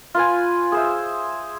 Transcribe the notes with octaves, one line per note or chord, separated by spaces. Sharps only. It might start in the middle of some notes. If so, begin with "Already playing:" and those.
F4 B4 G#5
G#4 C5 E5